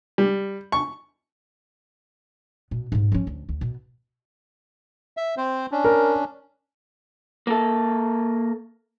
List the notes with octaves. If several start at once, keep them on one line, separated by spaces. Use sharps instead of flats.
G3
C#6
B2
G#2 C3
F3 C#4
D2
D2
B2
E5
C4 C5
C#4 D4
A#4
A#3 A4